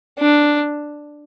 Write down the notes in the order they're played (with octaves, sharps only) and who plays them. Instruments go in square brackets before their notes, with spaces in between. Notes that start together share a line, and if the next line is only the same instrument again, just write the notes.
[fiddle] D4